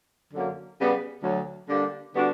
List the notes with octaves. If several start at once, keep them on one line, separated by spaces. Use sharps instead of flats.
F#2 D3 F#3 A#3
C#3 G3 B3
D2 D3 F#3
D3 G3 A#3 D4 G4
D3 G3 B3 D4 F#4